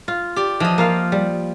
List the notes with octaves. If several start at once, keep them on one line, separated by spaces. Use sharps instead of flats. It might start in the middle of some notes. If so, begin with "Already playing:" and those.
F4
G4 D5
E3 F3 D#5
A#3 F4 F5
G3